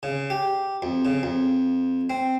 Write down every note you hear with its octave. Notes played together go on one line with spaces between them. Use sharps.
C#3
G4
F2
C#3
F2
C4